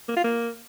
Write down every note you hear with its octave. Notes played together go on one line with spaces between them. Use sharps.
A#3
F4
A#3